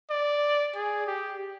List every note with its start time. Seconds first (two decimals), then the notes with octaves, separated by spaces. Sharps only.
0.10 D5
0.75 G#4
1.07 G4